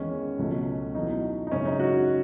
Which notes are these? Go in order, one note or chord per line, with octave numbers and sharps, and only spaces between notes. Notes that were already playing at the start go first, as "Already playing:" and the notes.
Already playing: E2 D#3 G#3 C#4
C#2 B2 F#3 A3
E2 B2 F#3 A3 D#4
D#4
F#2 C#3 G#3 C#4
D#4
F#4